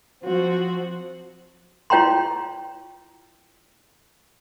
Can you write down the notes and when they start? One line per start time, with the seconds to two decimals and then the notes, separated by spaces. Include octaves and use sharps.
0.23 F3 C4 F#4
1.90 E4 F4 C#5 G5 A#5 C6